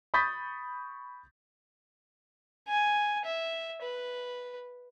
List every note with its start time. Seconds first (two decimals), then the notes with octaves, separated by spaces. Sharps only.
0.14 B5 C#6 D#6 G6 A6 B6
2.68 G#5
3.25 E5
3.82 B4